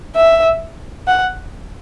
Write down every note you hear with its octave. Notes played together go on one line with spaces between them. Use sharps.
E5
F#5